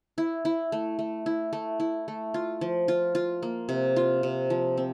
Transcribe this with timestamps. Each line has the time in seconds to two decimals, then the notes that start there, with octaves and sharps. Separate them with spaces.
0.18 E4
0.45 E4
0.72 A3
0.99 A3
1.26 E4
1.53 A3
1.80 E4
2.08 A3
2.34 F4
2.61 F3
2.88 F4
3.15 F4
3.42 A#3
3.69 C3
3.96 F4
4.23 C3
4.50 F3
4.77 C4